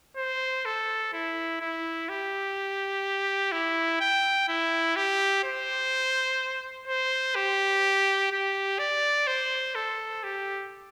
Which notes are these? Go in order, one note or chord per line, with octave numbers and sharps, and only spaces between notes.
C5
A4
E4
E4
G4
E4
G5
E4
G4
C5
C5
G4
G4
D5
C5
A4
G4